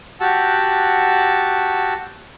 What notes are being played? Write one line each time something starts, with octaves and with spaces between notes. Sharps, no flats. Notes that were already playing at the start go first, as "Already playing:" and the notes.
F#4 G4 F#5 A5 E6